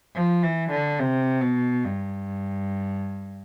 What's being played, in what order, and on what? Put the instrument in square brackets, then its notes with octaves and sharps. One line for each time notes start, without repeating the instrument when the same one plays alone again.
[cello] F3
E3
D3
C3
B2
G2